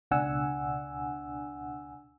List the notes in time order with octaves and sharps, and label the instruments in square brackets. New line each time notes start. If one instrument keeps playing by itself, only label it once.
[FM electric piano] C#2 B2 D4 F#5 G#5 E6